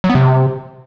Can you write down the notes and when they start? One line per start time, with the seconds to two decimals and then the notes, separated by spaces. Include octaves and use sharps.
0.04 F#3
0.09 B3
0.15 C3